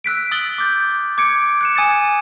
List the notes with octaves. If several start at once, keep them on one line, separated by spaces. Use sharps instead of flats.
E6 F#6 B6 D7
D#6 E6 F#6 A6 F#7 G7
D6 G6 A6
D6 G#6 C#7 D7
F#6 C#7 E7
G#5 D#6 G#6 A6 C#7